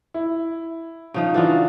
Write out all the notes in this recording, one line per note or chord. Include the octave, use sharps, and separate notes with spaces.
E4
C#3 F3 D#4
E3 D4 F4 F#4 A4